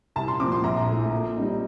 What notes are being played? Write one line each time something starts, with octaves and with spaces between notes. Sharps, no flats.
C2 A5
C6
A#2 F3 C4 D6
C6
A#1 A#5
A2 A3
A#2
G3 C4 D#4